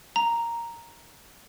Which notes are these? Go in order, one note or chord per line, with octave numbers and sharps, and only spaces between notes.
A#5